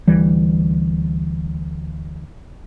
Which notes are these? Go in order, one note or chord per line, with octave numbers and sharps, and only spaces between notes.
D2 E3 G3